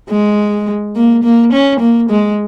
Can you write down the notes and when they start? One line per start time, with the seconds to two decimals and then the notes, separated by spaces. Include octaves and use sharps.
0.10 G#3
0.96 A#3
1.24 A#3
1.53 C#4
1.80 A#3
2.10 G#3